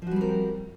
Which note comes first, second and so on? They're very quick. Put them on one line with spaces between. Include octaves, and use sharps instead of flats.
F3 F#4 G3 C4 A#4